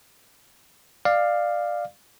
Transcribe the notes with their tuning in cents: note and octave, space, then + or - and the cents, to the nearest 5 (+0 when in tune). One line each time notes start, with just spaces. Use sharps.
D5 +20 F5 +0